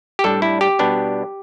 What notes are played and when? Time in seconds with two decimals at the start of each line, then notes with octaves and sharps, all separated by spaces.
0.19 G4
0.24 A2 G3 D4 A4
0.42 E4
0.61 G4
0.79 B2 G3 B3 D4